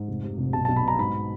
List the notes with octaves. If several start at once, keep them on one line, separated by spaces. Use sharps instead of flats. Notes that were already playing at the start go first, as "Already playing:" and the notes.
Already playing: G#2
F1
C3
F1
B1 A5
A5
B1
B5
B2 A#5
G#2 B5